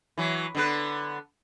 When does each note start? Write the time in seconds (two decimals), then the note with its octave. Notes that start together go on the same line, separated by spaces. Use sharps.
0.17 E3 F#3
0.55 D3 B3 B4